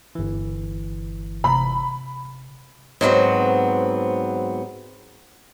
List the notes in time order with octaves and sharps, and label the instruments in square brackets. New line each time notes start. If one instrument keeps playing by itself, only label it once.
[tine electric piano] G1 E3
[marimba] C3 A#5 [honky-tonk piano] B5
[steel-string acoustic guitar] G#2 F#3 B3 C4